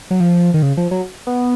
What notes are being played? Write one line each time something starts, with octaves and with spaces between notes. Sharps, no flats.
F#3
F3
D#3
C#3
F3
F#3
B3